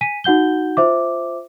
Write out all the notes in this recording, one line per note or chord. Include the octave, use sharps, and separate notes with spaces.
G#5 B6 D#7
D#4 F#4 F#5 G6 G7
F4 C5 E5 D6